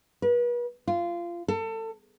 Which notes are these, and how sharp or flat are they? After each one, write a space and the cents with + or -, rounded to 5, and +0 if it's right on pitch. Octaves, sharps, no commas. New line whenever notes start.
B4 -40
F4 -20
A4 +30